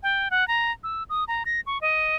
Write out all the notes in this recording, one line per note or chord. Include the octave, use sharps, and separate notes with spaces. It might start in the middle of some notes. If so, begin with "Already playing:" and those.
G5
F#5
A#5
E6
D#6
A#5
A#6
C#6
D#5